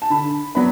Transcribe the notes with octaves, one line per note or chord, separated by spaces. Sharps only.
A5
D3 B5
F#3 B3 D4 B5